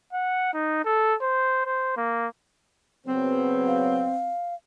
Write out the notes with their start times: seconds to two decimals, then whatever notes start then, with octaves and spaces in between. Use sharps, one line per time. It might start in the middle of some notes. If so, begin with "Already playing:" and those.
0.13 F#5
0.53 D#4
0.85 A4
1.22 C5
1.66 C5
1.97 A#3
3.07 C#3 F#3 B3 C4
3.67 F5